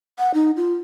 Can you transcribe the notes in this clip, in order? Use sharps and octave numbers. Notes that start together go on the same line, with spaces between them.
F#5
D#4
F4